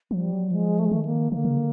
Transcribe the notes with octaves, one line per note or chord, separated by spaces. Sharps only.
F3 G3
F#3
F3 G#3
A3
G#3
D#3 A3
A#3
D3 A#3
C#3
D3